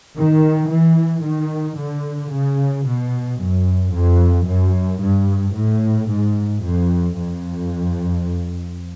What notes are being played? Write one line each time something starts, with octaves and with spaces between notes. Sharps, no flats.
D#3
E3
D#3
D3
C#3
B2
F#2
F2
F#2
G2
A2
G#2
F2
F2